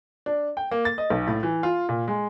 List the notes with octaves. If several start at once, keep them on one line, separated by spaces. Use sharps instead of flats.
D4
G5
A#3
A6
D#5
B1
A2
E3
F4
A#2
G#3